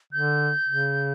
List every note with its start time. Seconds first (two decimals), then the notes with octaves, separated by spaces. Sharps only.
0.13 D3 G6
0.68 C#3